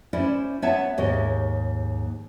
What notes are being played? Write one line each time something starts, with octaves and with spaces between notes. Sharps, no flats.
C#4 E4 C5 D5
B3 C#5 E5 A5
D#2 G#2 G4 C#5 D#5